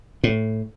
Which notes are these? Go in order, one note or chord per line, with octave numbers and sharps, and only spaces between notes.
A2